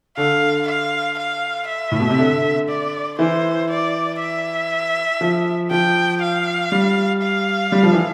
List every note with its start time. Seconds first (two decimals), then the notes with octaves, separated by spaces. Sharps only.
0.17 D3 F5
0.67 F5
1.19 F5
1.68 E5
1.92 A2
2.00 B2
2.10 C3
2.18 D3
2.69 D5
3.19 E3 C5
3.70 D5
4.19 E5
5.21 F3
5.71 F3 G5
6.22 F5
6.72 G3
7.22 F5
7.72 G3
7.83 F3
7.93 E3